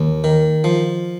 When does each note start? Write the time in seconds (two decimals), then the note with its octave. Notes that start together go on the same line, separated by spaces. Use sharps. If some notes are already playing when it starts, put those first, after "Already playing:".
Already playing: D#2
0.24 D#3
0.64 F3